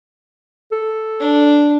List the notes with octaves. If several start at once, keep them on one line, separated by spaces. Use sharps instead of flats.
A4
D4